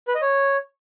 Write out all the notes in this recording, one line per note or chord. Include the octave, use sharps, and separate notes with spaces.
B4
D#5
C#5